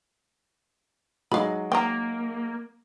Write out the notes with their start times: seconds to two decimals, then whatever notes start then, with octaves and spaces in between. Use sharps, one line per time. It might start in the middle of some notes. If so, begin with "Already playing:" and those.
1.31 F#3 G#3 D#4 F5 B5
1.72 A#3 G5 A#5